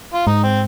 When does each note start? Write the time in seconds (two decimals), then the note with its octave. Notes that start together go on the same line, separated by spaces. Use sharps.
0.14 F4
0.27 G#2 D#4
0.44 C4